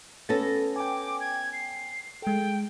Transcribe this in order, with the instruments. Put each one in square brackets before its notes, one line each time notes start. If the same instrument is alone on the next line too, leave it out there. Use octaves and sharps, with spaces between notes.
[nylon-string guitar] B3 C#4 A4 [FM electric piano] A6 A#6
[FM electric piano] G5 G#5 [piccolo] D6
[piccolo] G#6
C7
[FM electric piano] G#3 A4 [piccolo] G5